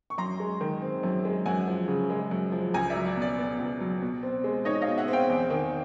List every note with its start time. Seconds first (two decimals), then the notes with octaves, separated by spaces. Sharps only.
0.10 C#6
0.18 F#2 A#5 C6
0.40 G#3
0.61 D#3
0.82 C4
1.03 F#2
1.25 G#3
1.46 F#2 F#5 G#5
1.68 F3
1.88 C#3
2.10 G#3
2.31 F#2
2.52 F3
2.74 C#2 G#5 A#5
2.90 D5 E5
2.95 F#3
3.06 D5
3.16 B2
3.22 D5
3.38 B3
3.59 C#2
3.80 F#3
4.02 B2
4.23 C4
4.44 G#3
4.65 D#4 C#5 D#5
4.82 D#5 F5
4.87 B2
4.98 E5 F#5
5.08 C4
5.13 F5 G5
5.29 E2
5.50 D#3